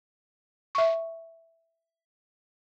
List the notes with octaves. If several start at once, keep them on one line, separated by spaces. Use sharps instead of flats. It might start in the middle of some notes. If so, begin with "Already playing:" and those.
E5 C#6